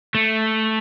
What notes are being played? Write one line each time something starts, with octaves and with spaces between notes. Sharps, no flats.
A3